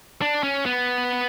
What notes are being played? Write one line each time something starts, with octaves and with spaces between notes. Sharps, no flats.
D4
C#4
B3